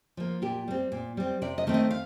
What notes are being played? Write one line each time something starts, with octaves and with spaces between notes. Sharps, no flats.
F3 A#3
A#2 G4
G3 C4
A#2
G3 C4
C3 D5
D#5
D#3 A3 C4
D#5
F5